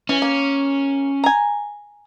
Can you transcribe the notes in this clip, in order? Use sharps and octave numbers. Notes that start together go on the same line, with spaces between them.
E3 C#4
A#3
G#5 A#5